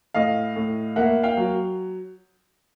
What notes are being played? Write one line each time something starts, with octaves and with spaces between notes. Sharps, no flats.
A2 D#5 F5
A2
A#3 E5 F#5
F5 G5
F#3